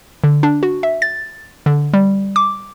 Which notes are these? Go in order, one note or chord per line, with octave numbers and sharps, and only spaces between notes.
D3
D4
F#4
E5
A6
D3
G3
D6